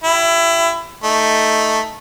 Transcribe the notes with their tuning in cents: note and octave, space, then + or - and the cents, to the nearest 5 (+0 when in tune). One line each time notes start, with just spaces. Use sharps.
E4 +25 G4 -25
A3 +0 D#4 +0